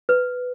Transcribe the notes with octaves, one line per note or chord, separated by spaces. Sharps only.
B4